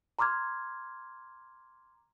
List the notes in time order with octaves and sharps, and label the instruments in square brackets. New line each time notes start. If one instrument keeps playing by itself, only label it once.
[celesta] A#5 C6 D6 F6 G#6